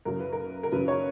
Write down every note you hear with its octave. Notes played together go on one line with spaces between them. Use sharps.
F#2 C#3 F#3 A#4
B4
A#4
A#4
F#2 C#3 F#3 B4
C#5